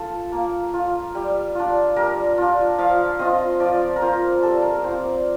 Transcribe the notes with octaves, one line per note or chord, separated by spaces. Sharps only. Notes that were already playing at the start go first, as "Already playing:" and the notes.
Already playing: F4 A4
A#3
F4
G3
D4 F4
G3 A#4
D4 F4
F3 F5
C4 F4 D#5
F3 D5
A#4
C4 F4 C5
G3 A4
A#4
A#4
C4 F4 C5
D5